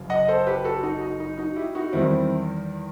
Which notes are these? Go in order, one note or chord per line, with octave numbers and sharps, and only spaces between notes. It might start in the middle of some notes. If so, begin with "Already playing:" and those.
Already playing: F#1 F#2
D#5 F#5
A4 C5
G4 B4
F#4 A4
D#4 F#4
D#4
D#4
D#4 F#4
E4 G4
D#4 F#4
E2 D#3 G3 C4 E4